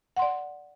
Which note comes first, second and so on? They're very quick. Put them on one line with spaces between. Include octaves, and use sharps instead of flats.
F#5 C6 D5